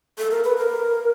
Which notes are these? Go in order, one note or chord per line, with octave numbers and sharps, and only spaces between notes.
A4
A#4
B4
A#4